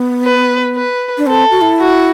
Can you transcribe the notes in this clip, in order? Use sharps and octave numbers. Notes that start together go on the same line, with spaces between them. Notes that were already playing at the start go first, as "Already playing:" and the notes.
Already playing: B3
B4
B4
D4
C4 A4
F#4
E4
F#4